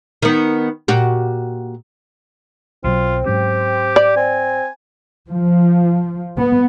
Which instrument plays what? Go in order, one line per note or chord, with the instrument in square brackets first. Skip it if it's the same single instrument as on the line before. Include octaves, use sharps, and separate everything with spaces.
[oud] D#3 B3
A#2 F#4 G4
[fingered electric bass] B1 B2 F#3 [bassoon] C4 [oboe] F4
[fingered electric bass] G#2 F#3 C#4 [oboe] G4
[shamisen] D5
[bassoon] C4 [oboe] G#5
[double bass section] F3
B3